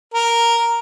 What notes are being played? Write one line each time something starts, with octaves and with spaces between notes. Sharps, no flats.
A#4